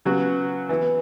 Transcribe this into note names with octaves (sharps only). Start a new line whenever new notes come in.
C#3 F#3 B3 F#4
E3 B3 E4